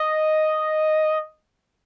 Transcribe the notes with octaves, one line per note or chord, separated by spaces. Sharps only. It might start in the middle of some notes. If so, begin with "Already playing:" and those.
Already playing: D#5